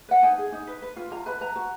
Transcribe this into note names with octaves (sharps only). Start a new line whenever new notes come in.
B4 F#5
D#4 G#5
G#4
D#4
B4
B4
F4
F4 A#5
B4 B5
B4 A#5
F#4